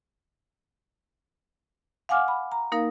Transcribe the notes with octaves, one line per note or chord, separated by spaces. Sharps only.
F5 F#5 G#5 D6 F6
B5
A#5
A#3 D#4 A#4 F5